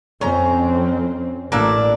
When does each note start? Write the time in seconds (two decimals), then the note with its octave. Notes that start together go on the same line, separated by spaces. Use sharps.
0.21 F2 C4 C#4 A#5
1.52 A1 A#3 D4 E4